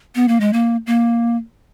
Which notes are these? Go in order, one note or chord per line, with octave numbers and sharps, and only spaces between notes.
B3
A#3
G#3
A#3
A#3